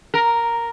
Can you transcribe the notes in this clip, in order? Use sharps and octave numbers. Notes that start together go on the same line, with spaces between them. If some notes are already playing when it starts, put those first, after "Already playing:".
A#4